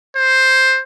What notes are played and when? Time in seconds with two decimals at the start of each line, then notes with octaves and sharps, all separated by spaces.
0.16 C5